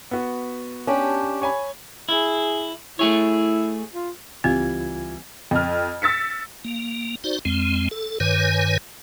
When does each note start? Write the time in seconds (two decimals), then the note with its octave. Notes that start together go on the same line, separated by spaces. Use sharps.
0.11 B3 F#4
0.87 C#4 D4 G4
1.42 C#5 G#5 B5
2.09 E4 G#4
2.99 A3 E4 G#4 C#5
3.93 F4
4.44 C#2 E3 G3 C4 F4 G#6
5.51 F2 F6
6.02 E6 A6 B6 C#7
6.65 A#3
7.24 D#4 F#4 C5 D5
7.45 F2 G#3 C4
7.91 A4
8.20 G2 D#3 B4 C#5 G#5